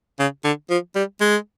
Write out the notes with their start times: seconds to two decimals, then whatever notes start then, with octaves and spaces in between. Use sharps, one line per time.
0.19 C#3
0.44 D3
0.70 F3
0.95 G3
1.21 G#3